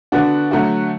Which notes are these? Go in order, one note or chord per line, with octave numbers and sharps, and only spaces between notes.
D3 B3 D4 F#4
D3 F#3 A3 F#4